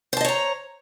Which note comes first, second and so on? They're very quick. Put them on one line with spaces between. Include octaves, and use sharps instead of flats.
C5 A5 D#5 C#5 A#5